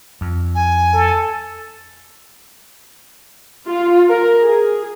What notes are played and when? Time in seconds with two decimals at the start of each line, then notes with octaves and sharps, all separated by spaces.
0.21 F2
0.55 G#5
0.94 A4
3.68 F4
4.09 A#4
4.41 G#4